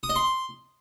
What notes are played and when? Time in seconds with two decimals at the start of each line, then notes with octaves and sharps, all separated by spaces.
0.03 D#6
0.09 D#5
0.16 C6